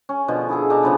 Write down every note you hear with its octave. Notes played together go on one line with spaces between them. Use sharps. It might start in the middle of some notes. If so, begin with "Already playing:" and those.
C#4
B2 D3 F3
E4 G#4 A4
B2 D4 A5 A#5
C#3 F3 B3